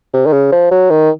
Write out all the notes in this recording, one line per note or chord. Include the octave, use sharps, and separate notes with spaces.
C3
D#3
C#3
F3
F#3
D#3